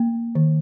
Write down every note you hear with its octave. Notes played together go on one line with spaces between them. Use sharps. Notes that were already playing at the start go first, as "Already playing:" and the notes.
Already playing: A#3
D#3